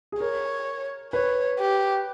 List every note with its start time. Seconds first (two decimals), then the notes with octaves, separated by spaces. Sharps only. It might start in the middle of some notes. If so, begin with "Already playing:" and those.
0.12 G#4
0.20 A#4 C#5
1.13 B4 C#5
1.59 G4